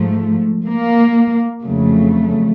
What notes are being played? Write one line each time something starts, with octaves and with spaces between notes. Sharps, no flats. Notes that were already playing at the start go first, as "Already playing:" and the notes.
Already playing: G#2 F3 A3
A#3
F2 C#3 F#3 A3